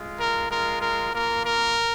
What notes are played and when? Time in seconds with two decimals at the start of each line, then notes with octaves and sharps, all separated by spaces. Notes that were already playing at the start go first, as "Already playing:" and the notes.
Already playing: G#3 F4
0.18 A#4
0.49 G#3 F4 A#4
0.81 A#4
1.13 A#3 F4 A#4
1.44 A#4